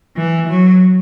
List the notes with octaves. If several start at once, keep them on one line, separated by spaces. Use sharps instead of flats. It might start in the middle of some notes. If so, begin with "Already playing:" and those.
E3
F#3